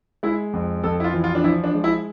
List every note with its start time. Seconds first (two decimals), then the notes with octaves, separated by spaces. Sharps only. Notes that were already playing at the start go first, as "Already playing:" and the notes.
0.23 G#3 E4
0.53 F2
0.84 F2 A4
1.00 E4
1.04 F4
1.13 E3
1.24 F4
1.35 D4
1.44 F3 E4
1.64 D4
1.75 G#3
1.84 E4